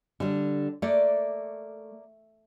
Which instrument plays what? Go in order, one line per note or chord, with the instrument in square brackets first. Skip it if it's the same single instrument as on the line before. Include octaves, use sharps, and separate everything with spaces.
[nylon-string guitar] D3 G3
[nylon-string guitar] A3 [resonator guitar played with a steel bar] A#3 D5